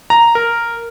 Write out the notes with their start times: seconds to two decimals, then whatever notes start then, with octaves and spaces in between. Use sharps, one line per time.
0.10 A#5
0.35 A#4